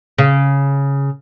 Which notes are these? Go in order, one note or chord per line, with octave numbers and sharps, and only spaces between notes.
C#3